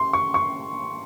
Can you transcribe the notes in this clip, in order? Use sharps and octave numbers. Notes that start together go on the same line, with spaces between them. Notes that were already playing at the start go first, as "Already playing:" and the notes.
Already playing: C6
C#6
C#6